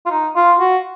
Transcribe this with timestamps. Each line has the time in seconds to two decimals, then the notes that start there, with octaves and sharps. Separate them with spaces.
0.06 F4
0.10 D#4
0.35 F4
0.60 F#4